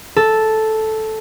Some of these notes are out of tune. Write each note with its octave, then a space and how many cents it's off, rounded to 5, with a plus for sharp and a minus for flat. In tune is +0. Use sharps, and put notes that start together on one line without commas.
A4 -5